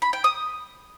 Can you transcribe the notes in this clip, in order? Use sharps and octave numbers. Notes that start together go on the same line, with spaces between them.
B5
G5
D#6